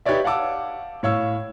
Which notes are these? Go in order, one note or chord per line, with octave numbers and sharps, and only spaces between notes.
D#4 G4 B4 C#5 D5 E5
F5 F#5 A5 D6 E6
A2 C#5 F5 E6